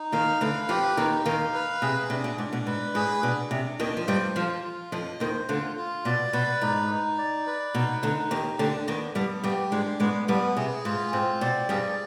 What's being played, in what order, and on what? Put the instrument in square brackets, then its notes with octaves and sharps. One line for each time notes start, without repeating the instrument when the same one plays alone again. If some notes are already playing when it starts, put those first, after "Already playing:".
Already playing: [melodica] D#4
[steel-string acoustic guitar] D#2 D#3 [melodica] F5
[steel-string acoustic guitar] D2 D3 [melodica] B4
[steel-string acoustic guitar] F2 F3 [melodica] G4
[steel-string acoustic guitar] D#2 D#3 [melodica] D#4
[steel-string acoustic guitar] D#2 D#3 [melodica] F5
[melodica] B4
[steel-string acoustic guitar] C3 [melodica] G#4
[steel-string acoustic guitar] C3 [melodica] D4
[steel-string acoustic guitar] B2
[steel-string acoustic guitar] G#2 [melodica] D4
[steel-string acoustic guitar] B2
[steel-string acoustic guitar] G#2 [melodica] B4
[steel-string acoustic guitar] G#2 [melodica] G#4
[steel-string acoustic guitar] B2 [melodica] D4
[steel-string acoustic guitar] C3 [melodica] D4
[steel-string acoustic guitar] D#2 D#3 [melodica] D#5
[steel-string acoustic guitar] F3
[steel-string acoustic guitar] G2 G3 [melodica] C5
[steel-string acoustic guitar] F2 F3 [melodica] F4
[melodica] F4
[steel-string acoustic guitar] F2 F3 [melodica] D#5
[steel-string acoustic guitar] D#2 D#3 [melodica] C5
[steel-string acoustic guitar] D2 D3 [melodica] F4
[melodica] F4
[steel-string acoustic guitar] B2 [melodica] D5
[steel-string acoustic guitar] B2 [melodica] B4
[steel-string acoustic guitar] G#2 [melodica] D#4
[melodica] D#4
D5
B4
[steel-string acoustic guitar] B2 [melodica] D#4
[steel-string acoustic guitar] D2 D3 [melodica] D#4
[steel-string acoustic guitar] D#2 D#3 [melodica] G4
[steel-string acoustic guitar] D2 D3 [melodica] D4
[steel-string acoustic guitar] D#2 D#3 [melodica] B3
[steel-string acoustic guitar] G2 G3 [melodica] B3
[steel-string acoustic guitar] G2 G3 [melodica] G4
[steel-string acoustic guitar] G#2 G#3 [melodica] D4
[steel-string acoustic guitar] G#2 G#3 [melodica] B3
[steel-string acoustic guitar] G2 G3 [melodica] B3
[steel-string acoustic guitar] C3 [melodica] G#4
[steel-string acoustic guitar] G#2 [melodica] F4
[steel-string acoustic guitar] G#2 [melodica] C4
[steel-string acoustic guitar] B2 [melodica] D5
[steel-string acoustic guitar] G2 G3 [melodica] G#4